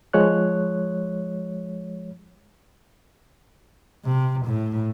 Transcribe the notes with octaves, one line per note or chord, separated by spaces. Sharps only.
F3 G#3 C#5 F#6
C3
A2